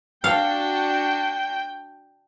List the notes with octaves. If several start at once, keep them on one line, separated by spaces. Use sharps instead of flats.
D4 F#4 F5 G5